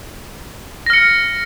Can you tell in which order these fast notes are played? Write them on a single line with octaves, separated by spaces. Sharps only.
A#6 F6 C#7